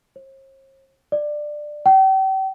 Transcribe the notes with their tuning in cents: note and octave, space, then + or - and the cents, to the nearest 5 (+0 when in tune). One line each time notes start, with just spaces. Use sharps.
C5 +45
D5 +15
G5 -40